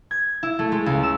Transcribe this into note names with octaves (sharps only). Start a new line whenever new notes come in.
G#6
E4
A3
G#3
C#2
E6